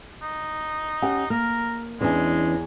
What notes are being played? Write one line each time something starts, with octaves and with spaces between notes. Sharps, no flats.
D#4
C#4 G4 F#5
A#3 A#4 F6
E2 E3 G#3 C#4 D4 E4 G#5